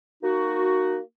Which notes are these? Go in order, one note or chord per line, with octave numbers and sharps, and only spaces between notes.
A#3 D#4 F#4